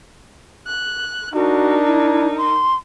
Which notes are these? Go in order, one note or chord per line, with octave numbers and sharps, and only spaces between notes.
F#6
D4 D#4 F#4 A#4
E4
C6